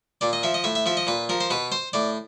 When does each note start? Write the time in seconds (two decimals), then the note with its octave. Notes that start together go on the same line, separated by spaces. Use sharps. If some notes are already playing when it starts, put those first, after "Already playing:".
0.21 A#2 D5
0.33 D#5
0.43 F3 E5
0.54 D#5
0.64 A2 E5
0.75 E5
0.86 F3 E5
0.97 D#5
1.07 A#2 B4
1.29 F3 A#4
1.41 C5
1.50 B2 B4
1.72 C5
1.93 A2 D5